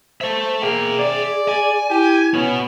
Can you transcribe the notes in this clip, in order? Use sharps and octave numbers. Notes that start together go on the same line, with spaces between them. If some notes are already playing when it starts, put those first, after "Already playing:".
A4 C5 E5
A#3 G#4 E5 G5
D5
G#5
E4 G4
B3 C#4 F#4